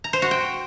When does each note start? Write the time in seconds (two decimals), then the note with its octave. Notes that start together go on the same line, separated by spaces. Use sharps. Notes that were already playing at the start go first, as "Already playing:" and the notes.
0.04 A#5
0.13 C5
0.22 F#4
0.31 G5